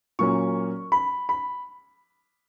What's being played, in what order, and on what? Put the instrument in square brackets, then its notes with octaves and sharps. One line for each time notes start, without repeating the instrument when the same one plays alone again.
[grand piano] A#2 F#3 A#3 C#4 C#6
B5
B5